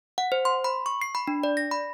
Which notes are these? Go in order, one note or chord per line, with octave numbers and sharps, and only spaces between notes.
F#5
C5
C6
B5
C#6
C7
B5
D4
D5
A#6
B5